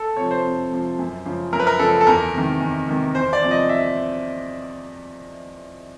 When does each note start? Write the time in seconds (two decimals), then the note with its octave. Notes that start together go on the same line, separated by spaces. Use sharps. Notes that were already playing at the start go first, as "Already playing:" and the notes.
Already playing: A4
0.17 C3 F3 C#5
0.31 C5
0.44 F2
0.71 C3 F3
0.99 F#2
1.26 C#3 F3
1.52 F#2 A#4
1.60 B4
1.67 A#4
1.79 C#3 F3 A4
2.01 A4
2.06 E2 A#4
2.34 C3 D#3
2.60 E2
2.87 C3 D#3
3.15 E2 C5
3.33 D5
3.42 C3 F3
3.51 D#5
3.69 E5